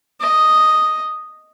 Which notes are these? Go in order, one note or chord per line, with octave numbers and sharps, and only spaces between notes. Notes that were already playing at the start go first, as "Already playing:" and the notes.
D#5